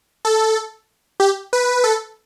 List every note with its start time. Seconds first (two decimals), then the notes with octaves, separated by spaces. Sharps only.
0.25 A4
1.20 G4
1.53 B4
1.84 A4